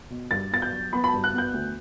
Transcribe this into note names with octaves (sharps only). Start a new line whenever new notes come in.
B2
G2 A6
B3 A6
G6
F#3
B3 B5
B5
A5
G2
F#6
B3 G6
D2